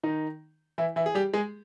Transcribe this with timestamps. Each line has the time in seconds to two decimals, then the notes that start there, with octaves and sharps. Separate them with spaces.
0.03 D#3 D#4
0.78 E3 E4
0.96 E3 E4
1.06 G#4
1.15 G3 G4
1.34 G#3 G#4